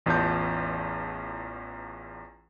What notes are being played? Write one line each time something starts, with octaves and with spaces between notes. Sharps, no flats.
A1 E2 B3 F4 A5 G6